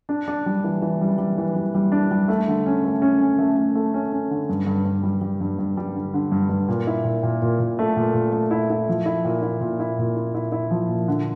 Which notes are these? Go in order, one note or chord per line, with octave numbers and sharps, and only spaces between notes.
D4
D4
G3
E3
E3
G3
G3
E3
G3
G3
D4
G3
A3
D3
C#4
A3
C#4
C#4
A3
A3
A3
C#4
C#4
D3
G2
G2
G2
G3
G3
G2
G2
G3
D3
D3
G2
G2
A#2
E4
A#2
A#2
A#2
A#2
A3
A#2
A#2
A3
E4
E4
F3
E4
A#2
E4
A#2
E4
A#2
E4
E4
E4
F3
A#2
D3